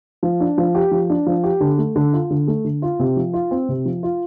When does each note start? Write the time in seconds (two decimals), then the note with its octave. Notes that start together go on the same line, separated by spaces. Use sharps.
0.23 F3
0.40 D4
0.58 F3
0.75 G4
0.91 F3
1.10 D4
1.26 F3
1.44 G4
1.60 D3
1.78 A3
1.96 D3
2.13 F4
2.30 D3
2.47 A3
2.65 D3
2.82 F4
2.99 C3
3.17 F3
3.33 F4
3.51 C4
3.69 C3
3.85 F3
4.03 F4